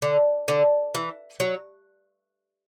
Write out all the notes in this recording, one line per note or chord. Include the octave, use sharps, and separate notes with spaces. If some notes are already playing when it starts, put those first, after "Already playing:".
D3
D3
E3
F#3